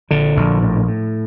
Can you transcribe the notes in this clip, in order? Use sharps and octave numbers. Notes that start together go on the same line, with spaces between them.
A#1 D3
A#1
A2
A2